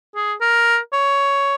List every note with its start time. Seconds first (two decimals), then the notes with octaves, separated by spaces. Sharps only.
0.16 G#4
0.41 A#4
0.93 C#5